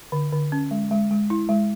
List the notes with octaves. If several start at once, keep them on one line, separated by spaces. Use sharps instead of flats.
D3
D3
C#4
G#3
G#3
G#3
E4
G#3